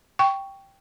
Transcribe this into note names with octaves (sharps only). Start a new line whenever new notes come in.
G5 C#6